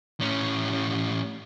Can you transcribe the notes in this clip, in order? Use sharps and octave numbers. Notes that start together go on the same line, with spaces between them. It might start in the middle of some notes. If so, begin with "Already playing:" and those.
A2 C#4